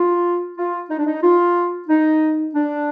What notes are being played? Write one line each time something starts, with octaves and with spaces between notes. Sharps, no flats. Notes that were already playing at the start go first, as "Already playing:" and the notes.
Already playing: F4
F4
D#4
D4
D#4
F4
D#4
D4